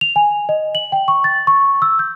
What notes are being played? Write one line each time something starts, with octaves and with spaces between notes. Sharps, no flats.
F7
G#5
D#5
F#7
G5
C#6
A6
C#6
E6
G6